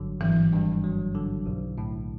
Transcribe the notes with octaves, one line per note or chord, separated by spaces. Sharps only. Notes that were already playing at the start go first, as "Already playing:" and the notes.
Already playing: G#1 G2 D3 F#3
G#1 E3
G2
F#3
D3
B1
A2